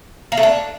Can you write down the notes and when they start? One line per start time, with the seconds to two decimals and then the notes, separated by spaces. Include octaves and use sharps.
0.32 A#3
0.37 A3
0.43 D4